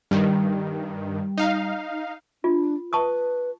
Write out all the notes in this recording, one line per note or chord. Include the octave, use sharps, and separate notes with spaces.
G2 D#3 G3
D#4 F5
D4 F4
B4 A5 C#6 D#6